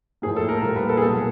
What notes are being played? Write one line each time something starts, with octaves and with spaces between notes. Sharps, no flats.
A2 F3 A#3 G#4
A4
A#4
A#2 G3 A#3 A#4
B4
A4
G#4
B2 F#3 A#3 A4